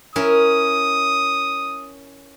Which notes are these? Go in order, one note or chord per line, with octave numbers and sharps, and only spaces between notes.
C#4 E4 A#4 D#6